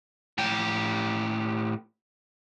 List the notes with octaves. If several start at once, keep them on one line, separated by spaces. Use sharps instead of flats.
A2 G4